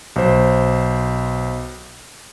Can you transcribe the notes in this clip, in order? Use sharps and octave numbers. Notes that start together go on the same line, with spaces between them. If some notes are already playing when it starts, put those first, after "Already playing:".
B1 C5